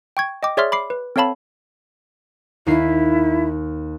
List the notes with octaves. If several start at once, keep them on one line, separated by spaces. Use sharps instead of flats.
G5 C#6 G#6
D#5 G5 D6
G#4 C#5 D5 E5 C6 F6
B5 D6 C7
B4
C4 A4 C#5 F5 A5 B5
D#2 D#4 E4 C7